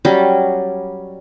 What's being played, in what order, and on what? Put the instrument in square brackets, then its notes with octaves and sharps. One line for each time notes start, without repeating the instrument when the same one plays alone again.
[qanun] F#3 G3 C#4 G4